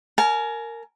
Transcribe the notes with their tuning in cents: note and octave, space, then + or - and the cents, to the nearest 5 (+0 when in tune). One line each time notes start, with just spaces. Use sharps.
A#4 -15 G#5 +30